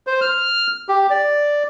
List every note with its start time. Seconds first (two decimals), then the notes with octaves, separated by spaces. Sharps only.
0.07 C5
0.21 F6
0.89 G4
1.10 D5